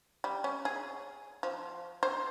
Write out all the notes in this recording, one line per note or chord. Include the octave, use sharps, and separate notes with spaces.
G3
C#4
G#4
F3
C5